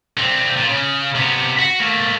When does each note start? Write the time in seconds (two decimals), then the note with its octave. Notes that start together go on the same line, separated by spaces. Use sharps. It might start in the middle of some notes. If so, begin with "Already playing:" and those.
0.17 D3 C4
0.57 A#2
0.69 C#3
1.15 C3 B3
1.59 F#4
1.80 A3 A#3